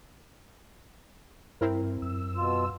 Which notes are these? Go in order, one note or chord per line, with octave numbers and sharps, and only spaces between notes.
G2 C4 E4 A#4
F#2 E6
B2 F4